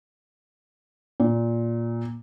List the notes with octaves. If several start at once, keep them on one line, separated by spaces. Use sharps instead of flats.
A#2